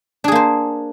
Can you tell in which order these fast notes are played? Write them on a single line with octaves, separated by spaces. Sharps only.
D4 G#4 A#3 C5